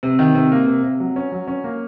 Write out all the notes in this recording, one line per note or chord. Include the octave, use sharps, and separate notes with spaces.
C3
D#3
C3
A#3
C3
C3
F#3
C#4
F#3
C#4
A#3